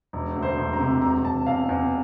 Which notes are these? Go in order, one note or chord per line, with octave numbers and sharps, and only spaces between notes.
E1
D2
C5
E1
A#5
C3
E1 A#5
E1 A5
E2 F5
E2